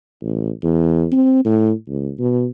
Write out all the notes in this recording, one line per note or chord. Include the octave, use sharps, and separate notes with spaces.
A1
E2
C4
A2
C#2
B2